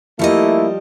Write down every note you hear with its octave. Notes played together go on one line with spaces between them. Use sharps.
F3 G3 A3 A#3 E4 D#5